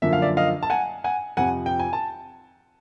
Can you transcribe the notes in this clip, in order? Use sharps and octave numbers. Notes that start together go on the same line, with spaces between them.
F#2 D3 F3 A#3 E5
F5
D5 E5
D#5 F5
A5
F#5 G#5
F#5 G#5
F2 C3 F3 F#5 G#5
G5
G#5
A5